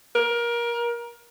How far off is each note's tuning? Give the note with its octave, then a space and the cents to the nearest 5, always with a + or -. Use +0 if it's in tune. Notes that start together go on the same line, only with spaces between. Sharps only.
A#4 +25